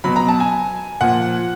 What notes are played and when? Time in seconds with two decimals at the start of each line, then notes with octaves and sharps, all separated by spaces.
0.04 B2 F#3 B5
0.16 A#5
0.28 A5
0.40 G#5
1.01 A#2 F3 F#5